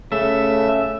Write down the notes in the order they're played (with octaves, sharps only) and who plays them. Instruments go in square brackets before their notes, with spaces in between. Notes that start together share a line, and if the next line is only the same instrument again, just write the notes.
[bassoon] C#3 [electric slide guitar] A3 [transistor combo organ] E5